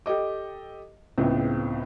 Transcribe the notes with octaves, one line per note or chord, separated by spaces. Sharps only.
G4 A4 D#5 D6
C#2 A2 C#3 B3 C4